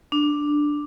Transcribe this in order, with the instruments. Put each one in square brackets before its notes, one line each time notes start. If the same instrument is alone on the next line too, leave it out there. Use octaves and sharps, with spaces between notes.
[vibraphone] D4